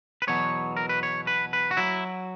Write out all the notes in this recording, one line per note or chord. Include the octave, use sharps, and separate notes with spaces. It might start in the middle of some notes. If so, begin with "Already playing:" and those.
B4
E2 B2 F#3 C#5
A#4
B4
C#5
B4
B4
F#4
F#3 E4